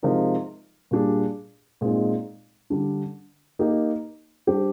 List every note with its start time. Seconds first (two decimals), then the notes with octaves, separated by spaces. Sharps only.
0.03 C3 F3 G#3 D#4 A#4
0.91 A#2 G3 D4 G#4
1.81 A#2 G#3 C4 D#4
2.70 D3 G3 D4
3.59 A#3 D#4 G4
4.47 G3 D4 G4 C5